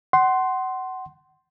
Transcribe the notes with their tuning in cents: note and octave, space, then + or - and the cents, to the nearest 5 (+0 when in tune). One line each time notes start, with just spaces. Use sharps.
F#5 +25 C6 +0